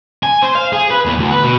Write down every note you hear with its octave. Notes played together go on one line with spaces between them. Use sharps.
G#5
C5
F5
G#4
B4
E2
D2
B4
B2